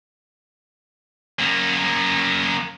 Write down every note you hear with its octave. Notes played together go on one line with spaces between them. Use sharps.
F#2 A#3